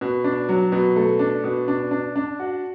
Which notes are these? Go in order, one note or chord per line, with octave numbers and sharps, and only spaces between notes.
B2
D4
F#3
B2
A3
D4
B2
D4
D4
D4
F#4